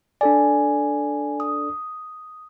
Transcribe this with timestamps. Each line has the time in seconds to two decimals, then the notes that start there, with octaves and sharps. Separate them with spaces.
0.21 D4 A4 D5 G#5
1.40 D#6